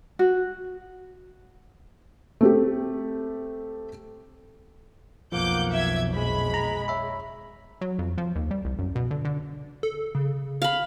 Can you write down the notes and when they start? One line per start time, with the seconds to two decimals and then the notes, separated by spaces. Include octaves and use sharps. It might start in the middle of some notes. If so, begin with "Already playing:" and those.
0.19 F#4
2.41 A3 C4 G4
5.32 B1 F2 F3 A#3 F#5 D6 G6
5.73 E5 G#6
6.14 G#3 B5
6.54 A#5
6.88 C#5 E5 B5
7.81 F#3
7.99 F2
8.18 F3
8.36 D#2
8.51 G3
8.65 C2
8.79 F#2
8.96 B2
9.11 D3
9.25 D3
9.83 A4
10.15 C#3
10.62 F5 B5